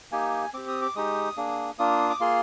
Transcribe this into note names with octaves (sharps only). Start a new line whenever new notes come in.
A#3 D#4 G4 G#5
C4 G4 D6
D#6
D6
G#3 D#4 G4 D#6
A#3 D4 G#4
A#3 D4 F4 D#6
D6
A#3 F4 G#4 C6